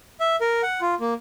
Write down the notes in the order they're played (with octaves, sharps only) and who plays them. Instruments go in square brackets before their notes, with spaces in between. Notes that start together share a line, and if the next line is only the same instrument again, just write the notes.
[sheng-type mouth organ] E5
A#4
F#5
F4
A#3